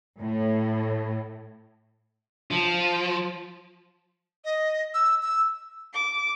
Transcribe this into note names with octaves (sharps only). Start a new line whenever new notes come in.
A2
F3
D#5
E6
E6
D6